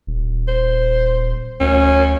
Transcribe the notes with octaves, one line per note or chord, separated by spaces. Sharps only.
D#1
C5
D2 C#4